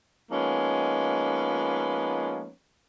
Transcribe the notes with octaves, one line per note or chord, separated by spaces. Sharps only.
F3 G#3 A#3 B3 C#4 D#4